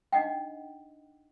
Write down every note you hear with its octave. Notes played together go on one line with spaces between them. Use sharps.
D4 D#4 D#5 F#5 G5